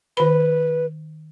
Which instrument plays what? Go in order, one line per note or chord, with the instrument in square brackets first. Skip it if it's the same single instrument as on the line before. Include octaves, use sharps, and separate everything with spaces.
[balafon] D#3 B5 [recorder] B4